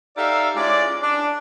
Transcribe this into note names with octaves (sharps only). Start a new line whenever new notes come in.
D#4 G4 A4 D5 E5 F5
G#3 C#4 E4 F4 D5
D4